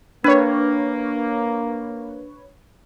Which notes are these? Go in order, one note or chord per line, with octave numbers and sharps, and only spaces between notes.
A#3 D4 B4 C#5